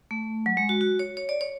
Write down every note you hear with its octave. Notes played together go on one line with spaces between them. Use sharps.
A3
F#3
G#3
F#4
F#4
C#5
C#5
D5
C#5